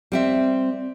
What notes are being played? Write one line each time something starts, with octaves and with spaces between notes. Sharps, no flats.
G3 C4 E5